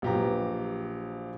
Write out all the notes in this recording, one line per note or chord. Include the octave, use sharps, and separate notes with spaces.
A#1 F#3 G4 B4 A#5